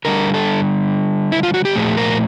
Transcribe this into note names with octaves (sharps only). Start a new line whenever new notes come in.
D3 G3 A#4
A4
E4
F4
F#4
G4
A#2 F3 A3 G#4
A#4